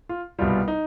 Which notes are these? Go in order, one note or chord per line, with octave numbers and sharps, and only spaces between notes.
F4
C2 B2 G3 F4
D#4